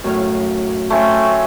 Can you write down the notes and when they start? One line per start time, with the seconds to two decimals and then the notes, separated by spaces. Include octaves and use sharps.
0.04 F#2 A2 F5
0.90 A3 C4 C#4